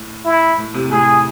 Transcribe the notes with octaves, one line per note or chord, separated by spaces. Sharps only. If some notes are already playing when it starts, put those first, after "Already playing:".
Already playing: A2
E4
A2
A2 C3
A2 C3 G#4